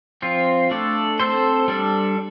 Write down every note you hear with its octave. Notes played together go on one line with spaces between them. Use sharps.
F3 C4 F4
A3 D4 A4 D5
C4 A4 C5
G3 D4 A4